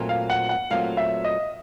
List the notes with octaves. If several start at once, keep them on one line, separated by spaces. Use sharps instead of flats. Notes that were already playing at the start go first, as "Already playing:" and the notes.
Already playing: A#2 F#3 A3 C4 F4
F5
F#5
F#5
A#2 F#3 A3 C4 F4 F5
E5
D#5